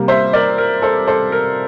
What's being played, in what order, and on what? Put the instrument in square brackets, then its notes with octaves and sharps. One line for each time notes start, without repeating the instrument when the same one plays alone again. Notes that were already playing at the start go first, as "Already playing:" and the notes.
Already playing: [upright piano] C3 G3 A#3
C5 E5
A#4 D5
A#4
A4 C5
A4 C5
A#4